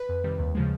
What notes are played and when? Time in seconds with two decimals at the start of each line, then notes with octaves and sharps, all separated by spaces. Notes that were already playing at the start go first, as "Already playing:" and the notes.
Already playing: B4
0.09 F2
0.24 C3 D#3 G3
0.39 D#2
0.55 C#3 F3 G#3